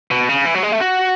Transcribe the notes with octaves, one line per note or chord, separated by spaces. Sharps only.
B2
C#3
E3
F#3
G#3
A3
F#4